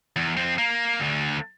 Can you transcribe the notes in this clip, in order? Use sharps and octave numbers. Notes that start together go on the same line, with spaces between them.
E2
F2 C4
A#3
D2 D3